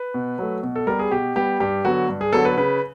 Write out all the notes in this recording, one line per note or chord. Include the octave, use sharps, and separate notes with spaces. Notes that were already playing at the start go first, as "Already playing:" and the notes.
Already playing: B4
B2
F#3 A3
B2
A4
G3 B3 A#4
G#4
B2 G4
G3 B3 G4
G2 G4
D3 F#3 B3 F#4
G2
G#4
D3 F#3 B3 A4
B4
C#3 B4